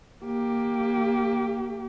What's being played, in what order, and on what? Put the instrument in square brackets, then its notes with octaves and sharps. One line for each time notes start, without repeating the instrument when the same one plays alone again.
[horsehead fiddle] A#3 G4